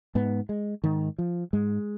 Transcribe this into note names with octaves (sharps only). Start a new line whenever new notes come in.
G#2 B3
G#3
G#2 D#3
F3
G#2 G#3